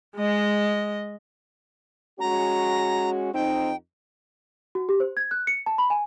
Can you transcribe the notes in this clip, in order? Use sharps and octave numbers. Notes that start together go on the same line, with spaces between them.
G#3 D#5
G#3 C#4 F#4 A#5
F2 C4 D#4 G5
F#4
G4
C5
G#6
F#6
C#7
A5
B5
G#5